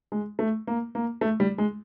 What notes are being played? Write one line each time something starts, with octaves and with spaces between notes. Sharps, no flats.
G#3
A3
A#3
A#3
A3
G3
G#3